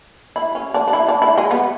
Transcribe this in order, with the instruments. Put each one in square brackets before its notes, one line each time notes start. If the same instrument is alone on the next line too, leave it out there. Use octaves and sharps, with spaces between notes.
[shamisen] E4
C#4
D4
D4
E4
D4
E4
G#3
B3